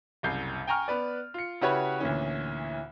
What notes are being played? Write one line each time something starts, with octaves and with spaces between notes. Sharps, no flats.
F#1 C2 G6 C7
G5 G#5 A#5 C#6 F6
B3 B4 D5
F4 C#7
C#3 E4 F#4 G4 B4 C#5
D2 A#2 E3 C#4